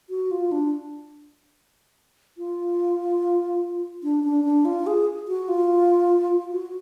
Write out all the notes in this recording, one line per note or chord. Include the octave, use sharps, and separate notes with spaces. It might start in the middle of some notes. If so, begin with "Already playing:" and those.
F#4
F4
D4
F4
D4
D4
D4
F4
G#4
F#4
F4
F#4